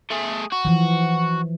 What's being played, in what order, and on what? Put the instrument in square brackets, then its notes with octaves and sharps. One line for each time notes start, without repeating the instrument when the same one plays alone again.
[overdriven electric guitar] A3 G#4
F#4
[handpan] E3 F3